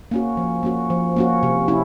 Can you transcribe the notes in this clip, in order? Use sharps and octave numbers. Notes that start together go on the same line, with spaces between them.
A#3 C#4 F#4
F3
A#3 C#4 F#4
F3
A#3 C#4 F#4
C3
C#4 E4